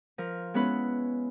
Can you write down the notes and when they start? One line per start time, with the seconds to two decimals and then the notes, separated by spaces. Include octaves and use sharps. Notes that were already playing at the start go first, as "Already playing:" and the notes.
0.18 F3 A#4
0.54 G#3 B3 C#4 E4 B4